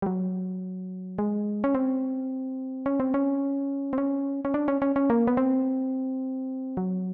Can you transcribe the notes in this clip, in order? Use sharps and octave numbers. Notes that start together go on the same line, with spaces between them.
G3
F#3
G#3
C#4
C4
C#4
C4
C#4
C4
C#4
C#4
D4
C#4
C#4
C#4
A#3
B3
C4
F#3